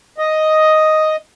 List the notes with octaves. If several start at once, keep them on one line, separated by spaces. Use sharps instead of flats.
D#5